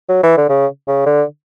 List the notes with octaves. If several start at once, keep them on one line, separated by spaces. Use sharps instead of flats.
F#3
E3
D3
C#3
C#3
D3